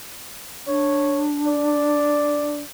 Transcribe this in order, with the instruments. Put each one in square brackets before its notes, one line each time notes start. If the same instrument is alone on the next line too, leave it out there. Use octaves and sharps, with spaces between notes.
[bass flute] D4 [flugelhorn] C#5
[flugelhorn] D5